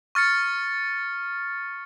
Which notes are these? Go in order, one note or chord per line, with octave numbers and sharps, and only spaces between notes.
C#6 F6 A6 C#7